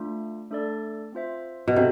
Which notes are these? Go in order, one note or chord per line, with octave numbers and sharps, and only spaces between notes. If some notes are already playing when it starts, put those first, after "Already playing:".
Already playing: A3 D4 F4
A3 D4 A4 D5
C4 F4 C5 E5
B2
C3 D4 A4